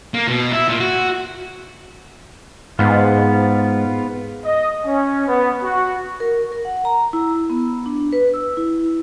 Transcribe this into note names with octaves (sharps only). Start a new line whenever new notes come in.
A#3
B2
E4
A#2
F#4
G#2 B3 F4
D#5
C#4
B3
F#4
A#4
A#4
F#5
A#5
E4
B3
D4
B4
E6
E4